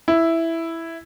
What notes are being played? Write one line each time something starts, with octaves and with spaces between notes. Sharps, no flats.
E4